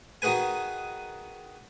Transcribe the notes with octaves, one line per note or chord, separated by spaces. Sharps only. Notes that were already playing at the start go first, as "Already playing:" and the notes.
D#3 D#4 F#4 G#4 B4 G#5